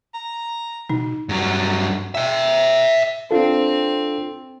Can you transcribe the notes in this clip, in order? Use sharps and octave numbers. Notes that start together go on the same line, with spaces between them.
A#5
B2 D#4
G2 F#3
E5 G5
C4 D4 F4 A4